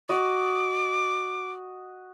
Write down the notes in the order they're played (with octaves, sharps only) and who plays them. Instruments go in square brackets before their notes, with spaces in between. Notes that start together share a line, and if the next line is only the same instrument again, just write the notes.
[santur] F#4 D#5 [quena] D6